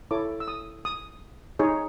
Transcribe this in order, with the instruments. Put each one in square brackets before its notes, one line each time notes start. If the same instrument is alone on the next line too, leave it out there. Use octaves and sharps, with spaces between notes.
[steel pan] E4 A4 C#5 D6
E6
D#6
D#6
D#4 G#4 C#5